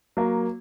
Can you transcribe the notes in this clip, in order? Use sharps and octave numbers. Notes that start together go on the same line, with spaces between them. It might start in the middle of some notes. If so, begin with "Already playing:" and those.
F#3 A#3